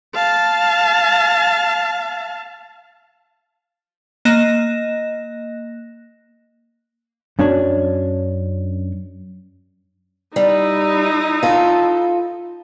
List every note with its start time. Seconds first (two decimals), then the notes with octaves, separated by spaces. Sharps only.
0.14 F5 A5
4.25 A#3 D#5 F#6 A#6 E7
7.39 F#2 C#4 D4 C#5
10.36 G3 D#4 E4
11.43 F4 A4